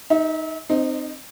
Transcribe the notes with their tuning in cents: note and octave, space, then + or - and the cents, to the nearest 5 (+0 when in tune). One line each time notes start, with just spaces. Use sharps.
D#4 +5 E5 -35
C4 +0 D#4 -25 D#5 +10